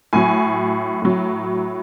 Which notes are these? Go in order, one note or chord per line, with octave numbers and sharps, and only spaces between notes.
A2 F#3 G#5
A2 F#3